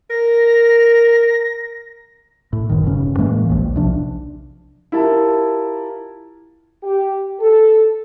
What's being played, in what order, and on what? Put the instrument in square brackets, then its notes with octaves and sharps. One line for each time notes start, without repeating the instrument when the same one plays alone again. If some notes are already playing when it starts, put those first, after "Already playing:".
[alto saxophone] A#4 [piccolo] A#6
[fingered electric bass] A2
G1 F#2 D#3
D#1 G2 C#3 C#4
A2 E3 G#3 A#3
A#1 D#2
B1 C3 F3 D4
[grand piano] E4 F4 G4 A#4 A5
[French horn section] G4
A4